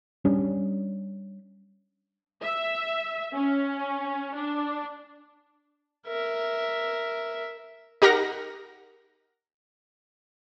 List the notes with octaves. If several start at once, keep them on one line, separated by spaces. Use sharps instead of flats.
G3 C#4 D4
E5
C#4
D4
A#4 E5
D#4 G4 A#4 F#5 A#6